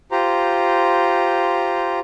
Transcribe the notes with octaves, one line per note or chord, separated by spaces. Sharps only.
F4 G4 C5 A#5